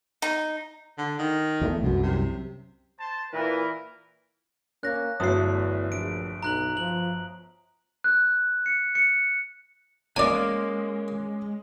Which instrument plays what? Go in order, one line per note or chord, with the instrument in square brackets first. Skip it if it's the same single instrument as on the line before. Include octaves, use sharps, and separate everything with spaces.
[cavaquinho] D#4
[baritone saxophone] D3
D#3
[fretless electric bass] E2 G#3 A3
[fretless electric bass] C2 F#2 [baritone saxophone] B2
[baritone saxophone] C3
[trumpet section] C5 A5
[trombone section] A#2 E3 [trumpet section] A#4 B4
[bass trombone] A#3 [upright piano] C#4 [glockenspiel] F#6 A#6
[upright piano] G1 F#3 A3 [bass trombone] E2 [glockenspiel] D#6 C7
[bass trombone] A#1 [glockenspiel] D7
[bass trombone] B1 [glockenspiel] A#5 F#6 F#7
[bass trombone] F3 [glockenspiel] F#7
[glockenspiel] F#6
C#7
C#7
[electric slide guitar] G#3 [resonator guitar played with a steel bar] A#3 [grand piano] C#4 D#5 D6 [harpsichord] D5 G#5